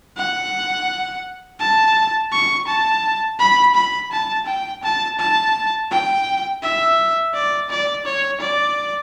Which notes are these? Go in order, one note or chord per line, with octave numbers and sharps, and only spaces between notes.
F#5
A5
C#6
A5
B5
B5
A5
G5
A5
A5
G5
E5
D5
D5
C#5
D5